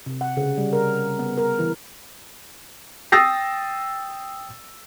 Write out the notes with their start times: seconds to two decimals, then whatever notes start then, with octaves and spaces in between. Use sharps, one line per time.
0.06 C3
0.21 F#5
0.37 C#3
0.58 G3
0.73 A#4
1.19 B3
1.38 A#4
1.59 E3
3.12 G5 D#6 E6 A6 A#6 C7